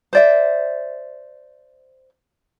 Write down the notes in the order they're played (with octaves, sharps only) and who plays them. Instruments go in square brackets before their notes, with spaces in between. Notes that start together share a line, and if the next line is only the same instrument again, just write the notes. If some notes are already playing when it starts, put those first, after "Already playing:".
[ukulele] C5 D5 E5